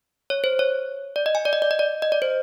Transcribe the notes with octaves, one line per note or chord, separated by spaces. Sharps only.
C#5
C5
C#5
D5
D#5
G#5
D5
D#5
D5
D#5
D5
D#5
D5
C5